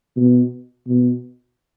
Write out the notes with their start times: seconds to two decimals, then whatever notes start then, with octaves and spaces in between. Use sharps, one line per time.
0.17 B2
0.87 B2